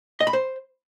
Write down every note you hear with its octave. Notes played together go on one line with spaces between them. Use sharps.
D#5
B5
C5